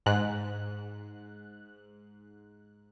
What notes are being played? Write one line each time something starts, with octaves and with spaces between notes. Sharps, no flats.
G#2 F#6